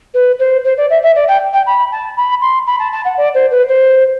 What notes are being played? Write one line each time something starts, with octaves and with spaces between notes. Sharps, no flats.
B4
C5
C5
D5
E5
E5
D5
G5
G5
B5
A5
B5
C6
B5
A5
A5
F#5
D5
C5
B4
C5